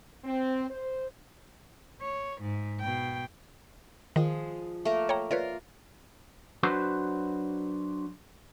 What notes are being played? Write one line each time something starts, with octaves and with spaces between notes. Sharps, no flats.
C4
C5
C#5
G#2
B2 G5
D#3 F3 G#3 G#4
A3 A#3 A#4
C#5 G5 A#5
F4 A#4 B4 C#5 D5
F#3 D4 F#4 B4 C5